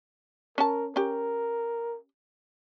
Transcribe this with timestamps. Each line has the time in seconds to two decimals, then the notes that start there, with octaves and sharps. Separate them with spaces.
0.58 C#4 A#4 A5
0.96 C#4 G4 A#4